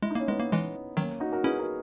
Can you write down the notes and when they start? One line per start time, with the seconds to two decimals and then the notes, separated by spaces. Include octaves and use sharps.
0.02 G#3 E4
0.10 D#4
0.15 A#3 C#4
0.27 G#3 B3 D#4
0.40 A#3
0.53 E3 G#3
0.96 D#3 F#3 A#3 C#4
1.20 D#4 F#4
1.33 F#4 A#4
1.44 C#4 E4 G#4 B4
1.59 F#4 A#4